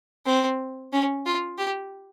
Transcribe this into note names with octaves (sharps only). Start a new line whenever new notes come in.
C4
C#4
F4
G4